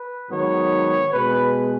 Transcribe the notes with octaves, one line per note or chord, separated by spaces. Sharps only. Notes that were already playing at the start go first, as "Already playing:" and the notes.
Already playing: B4
G#2 D#3 F#3 B3 C#5
B2 G#3 B3 B4